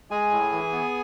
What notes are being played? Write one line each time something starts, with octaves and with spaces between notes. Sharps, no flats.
G#3 G#4 G#5
A2
E3
B3